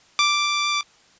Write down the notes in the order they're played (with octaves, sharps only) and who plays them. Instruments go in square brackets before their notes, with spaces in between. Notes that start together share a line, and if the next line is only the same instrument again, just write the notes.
[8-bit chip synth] D6